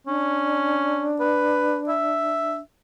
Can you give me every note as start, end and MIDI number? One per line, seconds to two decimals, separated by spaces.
0.07 1.11 61
0.07 2.60 62
1.20 1.79 71
1.88 2.58 76